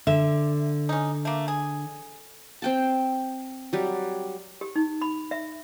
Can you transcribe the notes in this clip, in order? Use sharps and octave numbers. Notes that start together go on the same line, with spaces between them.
D3 E5
C#4 D#4
A3 A#3
G#4
C4 G5 A5
F#3 G3
G4
D#4
B5
E5